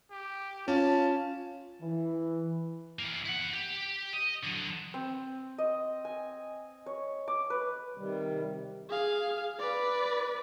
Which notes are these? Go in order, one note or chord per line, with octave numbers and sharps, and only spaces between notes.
G4
C#4 F4 A5
E3
E3 A#3
E4 F#5
G4
D#5
D3 F#3
C4
D#5
G#5
C#5
D6
B4
C3 D#3 G3
G#4 F5
B4 D5